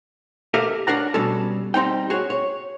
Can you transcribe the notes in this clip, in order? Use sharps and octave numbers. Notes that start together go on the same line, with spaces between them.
G4 A4 A#4 E5 F5
C#4 D4 A#4 F5 F#5 A#5
B2 G3 C#4 A4
G3 C4 D#4 G5
F#4 G#4 C#5
C#5